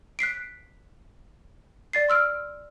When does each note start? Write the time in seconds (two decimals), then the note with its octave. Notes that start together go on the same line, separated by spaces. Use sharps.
0.19 F#6 B6 C7 D7
1.93 D5 A6 C7
2.09 C6 E6 F6 D7